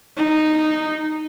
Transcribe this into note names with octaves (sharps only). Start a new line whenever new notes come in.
D#4